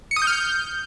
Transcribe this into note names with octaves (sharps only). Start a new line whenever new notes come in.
C#7
D#6
G6
F6
G6